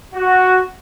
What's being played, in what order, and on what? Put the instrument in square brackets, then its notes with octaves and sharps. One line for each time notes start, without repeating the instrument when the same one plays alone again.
[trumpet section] F#4